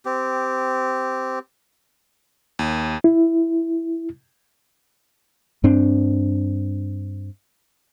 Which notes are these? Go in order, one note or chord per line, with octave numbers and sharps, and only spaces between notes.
C4 G4
D#2
E4
G2 C4 D4